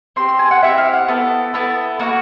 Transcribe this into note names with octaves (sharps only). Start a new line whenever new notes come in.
C4 E4 G4 C6
C6
G#5
F#5
C4 E4 G4 E5
F5
F#5
B3 E4 A4
B3 E4 A4
A#3 D#4 F#4 F#5